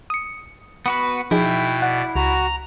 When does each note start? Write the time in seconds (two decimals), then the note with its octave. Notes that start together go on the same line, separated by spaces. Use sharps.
0.10 D#6 C#7
0.86 B3 F#4 B4
1.31 B2 F3 D#4 E4 G#4 G5
1.82 D5 F#5
2.15 C#2 F#4 A#5